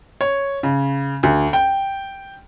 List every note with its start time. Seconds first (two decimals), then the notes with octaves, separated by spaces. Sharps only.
0.21 C#5
0.63 C#3
1.23 D2
1.53 G5